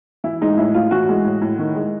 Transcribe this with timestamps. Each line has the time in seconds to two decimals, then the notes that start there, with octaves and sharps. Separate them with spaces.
0.24 E3 E4
0.41 G#3 D#4
0.57 A2 E4
0.74 A2 F4
0.91 E3 F#4
1.09 G#3
1.25 A2
1.42 A2
1.59 D#3
1.76 G#3